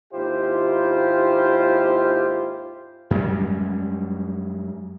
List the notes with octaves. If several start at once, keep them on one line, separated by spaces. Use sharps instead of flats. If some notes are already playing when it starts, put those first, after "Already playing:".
D#2 G#2 E4 F4 G4 C5
F#2 G3 G#3